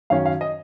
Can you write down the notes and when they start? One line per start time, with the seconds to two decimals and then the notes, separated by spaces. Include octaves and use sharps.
0.10 F#2 D#3 F#3 C#4 F5
0.26 F5
0.41 D#5